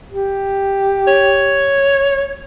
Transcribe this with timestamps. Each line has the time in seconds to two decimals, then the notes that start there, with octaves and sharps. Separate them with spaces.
0.11 G4
1.07 C#5